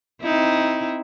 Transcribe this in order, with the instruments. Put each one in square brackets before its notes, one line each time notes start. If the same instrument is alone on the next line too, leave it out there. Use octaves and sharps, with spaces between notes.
[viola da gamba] C4 D#4 E4